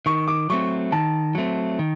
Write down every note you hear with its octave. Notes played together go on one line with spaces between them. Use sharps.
D#3 C#6
D6
F#3 A3 C4 C#6
D#3 A5
F#3 A3 C4
D#3